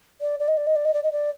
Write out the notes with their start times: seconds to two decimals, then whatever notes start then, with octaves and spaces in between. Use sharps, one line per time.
0.21 D5
0.39 D5
0.48 D#5
0.57 D5
0.67 D#5
0.76 D5
0.85 D#5
0.93 D5
1.03 D#5
1.12 D5